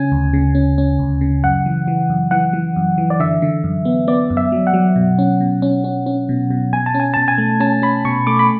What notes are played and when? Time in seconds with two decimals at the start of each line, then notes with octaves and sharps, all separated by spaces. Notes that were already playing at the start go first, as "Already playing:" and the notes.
Already playing: C#3 C#4 G#5
0.12 D2
0.33 C#3
0.55 C#4
0.78 C#4
0.99 D2
1.21 C#3
1.44 F#2 F#5
1.66 E3
1.88 E3
2.10 F#2
2.31 E3 F#5
2.53 E3
2.76 F#2
2.98 E3
3.10 D5
3.20 D3 E5
3.42 D3
3.64 F#2
3.85 B3
4.07 B3 D5
4.30 F#2
4.37 E5
4.52 F#3
4.67 F#5
4.74 F#3
4.96 B2
5.19 C#4
5.40 B2
5.62 C#4
5.84 C#4
6.06 C#4
6.29 B2
6.50 B2
6.73 B2 G#5
6.86 A5
6.95 C#4
7.00 G#5
7.14 B2 A5
7.28 G#5
7.38 A3
7.60 C#4 A5
7.82 C#4 B5
8.05 B2 C#6
8.27 A3 D6
8.39 B5